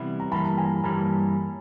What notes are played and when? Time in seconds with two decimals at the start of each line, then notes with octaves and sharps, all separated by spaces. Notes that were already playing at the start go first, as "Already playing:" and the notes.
Already playing: C3 E3 G3 B3 E4
0.20 A#5
0.32 G2 E3 G3 A#3 A5 B5
0.58 G#5 A#5
0.84 G2 E3 G3 A#3 A5 B5